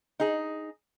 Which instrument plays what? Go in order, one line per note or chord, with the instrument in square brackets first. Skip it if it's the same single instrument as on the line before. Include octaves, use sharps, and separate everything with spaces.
[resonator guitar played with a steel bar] D#4 G#4